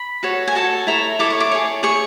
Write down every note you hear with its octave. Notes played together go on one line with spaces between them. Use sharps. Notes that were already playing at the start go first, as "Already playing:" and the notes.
Already playing: B5
F#4 A4 C#5
G#5
F#4 A4 C#5 A5
E4 A4 C#5 A#5
E4 A4 C#5 D6
C#6
D6
G#4 C#5
G#4 C#5 C#6